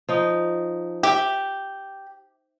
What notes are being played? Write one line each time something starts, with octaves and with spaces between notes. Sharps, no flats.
F3 D#4
G4 E5